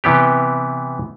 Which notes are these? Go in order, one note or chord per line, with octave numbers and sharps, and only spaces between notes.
C3 E3 B3 G4